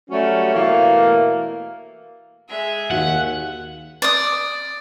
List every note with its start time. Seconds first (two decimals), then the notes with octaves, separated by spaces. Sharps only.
0.10 F#3 G3 A3 C#4
0.54 B2 E3 A3 A#3
2.49 G#3 E5
2.91 D#2 F#4 G4 F5 F#5
4.02 D5 D#6